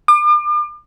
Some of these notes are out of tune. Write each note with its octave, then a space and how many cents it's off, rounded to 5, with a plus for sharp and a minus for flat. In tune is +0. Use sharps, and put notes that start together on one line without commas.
D6 +40